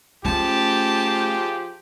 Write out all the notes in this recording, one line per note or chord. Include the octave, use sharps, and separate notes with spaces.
F3 A3 C#4 G4 G#4 A5